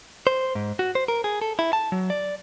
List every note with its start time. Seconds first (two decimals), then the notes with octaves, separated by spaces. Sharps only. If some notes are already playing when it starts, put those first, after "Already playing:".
0.27 C5
0.55 G#2
0.79 F#4
0.95 C5
1.08 A#4
1.24 G#4
1.42 A4
1.59 E4
1.73 A5
1.92 F#3
2.10 D5